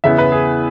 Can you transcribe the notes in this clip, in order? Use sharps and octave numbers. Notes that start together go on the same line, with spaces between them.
E2 C#3 E3 B3 E5
B4
G#4